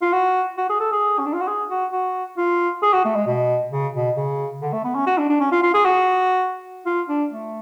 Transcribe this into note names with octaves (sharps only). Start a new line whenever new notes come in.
F4
F#4
F#4
G#4
A4
G#4
C#4
D4
F4
F#4
G#4
F#4
F#4
F4
G#4
F#4
A3
G#3
B2
C#3
B2
C#3
D3
A3
B3
C#4
F#4
D4
D4
C#4
F4
F4
G#4
F#4
F4
D4
A3